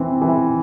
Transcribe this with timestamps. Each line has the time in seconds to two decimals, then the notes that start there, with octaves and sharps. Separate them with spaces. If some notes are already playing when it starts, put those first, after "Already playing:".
Already playing: E3 C4
0.22 E3